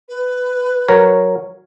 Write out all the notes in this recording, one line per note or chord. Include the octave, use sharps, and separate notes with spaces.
B4
F#3 A#4 C#5